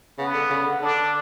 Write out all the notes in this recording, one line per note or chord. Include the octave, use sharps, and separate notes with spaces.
C#3 B3
D3
C#3
D3
D3 D4